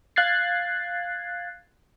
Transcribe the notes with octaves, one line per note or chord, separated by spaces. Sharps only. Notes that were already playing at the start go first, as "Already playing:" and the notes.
F5 F#6 G#6 A6 C7